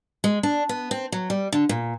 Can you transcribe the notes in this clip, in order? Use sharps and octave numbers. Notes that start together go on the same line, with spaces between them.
G#3
D4
B3
C4
F#3
G3
D3
A#2